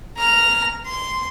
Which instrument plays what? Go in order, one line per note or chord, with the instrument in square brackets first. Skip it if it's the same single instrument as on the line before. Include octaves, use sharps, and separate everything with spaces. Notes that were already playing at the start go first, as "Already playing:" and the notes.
[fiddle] A#5 F6
C6